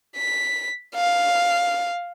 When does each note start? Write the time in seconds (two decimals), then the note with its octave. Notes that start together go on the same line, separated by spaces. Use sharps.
0.16 B6
0.95 F5